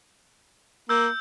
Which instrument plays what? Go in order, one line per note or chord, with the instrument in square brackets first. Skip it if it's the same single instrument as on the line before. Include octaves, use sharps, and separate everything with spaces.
[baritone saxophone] A#3 [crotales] E6 G6